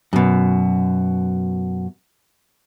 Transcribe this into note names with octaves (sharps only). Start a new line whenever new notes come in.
F#2 B2